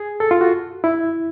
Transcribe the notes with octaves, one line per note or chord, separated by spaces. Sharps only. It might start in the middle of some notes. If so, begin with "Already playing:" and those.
Already playing: G#4
A4
F4
F#4
E4